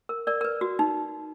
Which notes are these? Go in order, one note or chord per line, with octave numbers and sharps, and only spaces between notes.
A#4
A#4 D5
A#4
B4
F#4
D#4